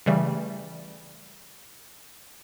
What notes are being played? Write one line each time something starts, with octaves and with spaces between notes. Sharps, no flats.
C#3 E3 G3 A3